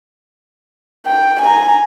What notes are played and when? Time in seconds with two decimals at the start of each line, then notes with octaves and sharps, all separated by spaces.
1.06 G5
1.41 G#5 A#5